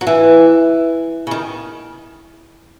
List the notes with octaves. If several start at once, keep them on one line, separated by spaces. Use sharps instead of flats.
F#3
E3
C#3
D#3